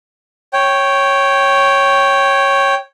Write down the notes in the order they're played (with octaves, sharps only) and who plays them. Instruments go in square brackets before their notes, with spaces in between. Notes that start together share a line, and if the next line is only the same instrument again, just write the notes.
[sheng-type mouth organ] C#5 G5